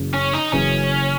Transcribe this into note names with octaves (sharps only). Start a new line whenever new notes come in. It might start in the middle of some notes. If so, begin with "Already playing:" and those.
Already playing: F#1 F#2 C#3 E3
C#4
D#4
F#1 F#2 C#3 E3 C#4